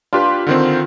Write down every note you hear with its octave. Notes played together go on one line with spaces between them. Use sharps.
D4 F4 G4 B4
D3 D#3 C4